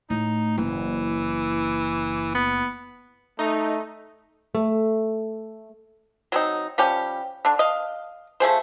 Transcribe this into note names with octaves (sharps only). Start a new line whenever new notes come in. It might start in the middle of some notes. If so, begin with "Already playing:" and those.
A2 D#4
F#1 E3
B3
A3 D#4
A3
F#3 C4 D#4
F3 G3 C#4 G4
D3 D4
D#5 F5
F3 A3 G#4 C5